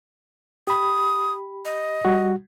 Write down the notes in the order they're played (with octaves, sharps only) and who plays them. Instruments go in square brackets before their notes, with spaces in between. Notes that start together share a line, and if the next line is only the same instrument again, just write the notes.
[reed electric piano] G4 B5 [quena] D#6
[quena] D#5
[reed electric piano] G3 F#4